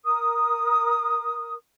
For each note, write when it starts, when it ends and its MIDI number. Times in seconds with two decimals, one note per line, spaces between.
0.04 1.53 70
0.04 1.53 87